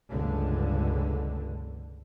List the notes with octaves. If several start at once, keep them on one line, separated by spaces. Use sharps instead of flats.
F1 C#2 G2 D3